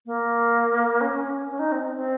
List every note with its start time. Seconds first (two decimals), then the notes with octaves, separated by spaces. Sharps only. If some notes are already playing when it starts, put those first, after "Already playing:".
0.06 A#3
1.01 C#4
1.24 C#4
1.47 C#4
1.59 D#4
1.72 C4
1.83 C4
1.96 C4